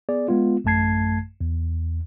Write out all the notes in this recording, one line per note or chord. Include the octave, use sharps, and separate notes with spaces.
B3 G#4 D5
G#3 B3 F4
A1 F#2 A3 A5 G#6 C7
E2